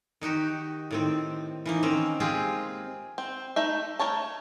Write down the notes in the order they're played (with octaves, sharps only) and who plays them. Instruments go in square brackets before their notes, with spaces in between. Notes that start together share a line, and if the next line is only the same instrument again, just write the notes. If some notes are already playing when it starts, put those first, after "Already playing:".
[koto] D#3 D#4 F#4 G4
A2 D#3 C4
E3 A#3 D#4
D#3 C4 C#4 A#5
G#3 C4 F4 G4 G#4
[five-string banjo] C4
A3 D#4 E5
A3 A#4 C#5 A5